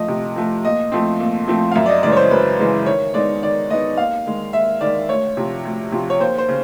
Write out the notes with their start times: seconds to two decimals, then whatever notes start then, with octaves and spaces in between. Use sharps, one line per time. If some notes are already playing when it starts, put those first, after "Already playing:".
Already playing: F3 A3 D#5
0.08 C3
0.36 F3 A3
0.65 A#2 D#5
0.92 F3 A3 C4
1.20 A#2
1.48 F3 A3 C4
1.71 F5
1.75 F#2 E5
1.86 D5
1.89 D#5
2.03 C#3 E3 G#3 D5
2.12 C#5
2.17 C5
2.31 F#2 B4
2.59 C#3 E3 G#3
2.86 D#3 C#5
3.14 G#3 B3 D#4 D5
3.42 D#3 D5
3.70 G#3 B3 D#4 D#5
3.97 D#2 F5
4.26 D#3 G#3
4.53 D#2 E5
4.81 D#3 G#3 D5
5.09 D2 C#5
5.37 C3 F3
5.65 D2
5.92 C3 F3
6.10 C#5
6.20 D#2 C5
6.38 C5
6.49 C#3